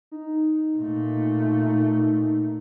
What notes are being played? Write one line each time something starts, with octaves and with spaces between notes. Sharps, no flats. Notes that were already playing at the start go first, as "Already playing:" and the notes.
D#4
A#2 A3